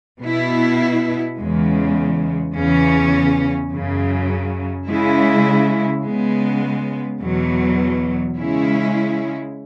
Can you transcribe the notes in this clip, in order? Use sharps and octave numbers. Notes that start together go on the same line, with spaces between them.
B2 B3 E4
E2 C#3 G#3
E2 C#3 E3 C#4
F#2 C#3 F#3
C#3 G#3 E4
C#3 G#3 B3
E2 B2 F#3
C#3 G#3 C#4 E4